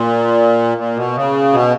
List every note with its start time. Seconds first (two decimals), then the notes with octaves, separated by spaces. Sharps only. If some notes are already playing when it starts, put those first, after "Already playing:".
Already playing: A#2
0.78 A#2
0.96 B2
1.16 C#3
1.53 B2